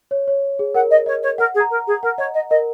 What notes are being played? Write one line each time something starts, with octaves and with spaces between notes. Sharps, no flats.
C#5
C#5
G#4
A#4 F#5
D#5
C#5 D#5
C#5
A#4 F#5
G#4
A#5
A#4
G#4
A#4 F#5
C#5 D#5
D#5
A#4 D#5